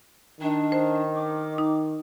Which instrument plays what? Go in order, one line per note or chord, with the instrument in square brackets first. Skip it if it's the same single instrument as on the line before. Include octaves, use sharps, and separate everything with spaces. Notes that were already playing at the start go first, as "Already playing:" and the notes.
[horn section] D#3 [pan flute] D4
[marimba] C5
[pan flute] D6
[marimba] D#4